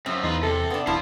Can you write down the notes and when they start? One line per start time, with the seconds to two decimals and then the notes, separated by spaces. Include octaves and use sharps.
0.06 F#2 F3 C4
0.23 E2 D#4 F4 B4
0.43 C3 A4
0.70 B3 D4
0.87 E1 E4 C5 F5 A5